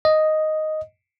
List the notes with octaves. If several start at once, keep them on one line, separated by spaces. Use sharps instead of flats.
D#5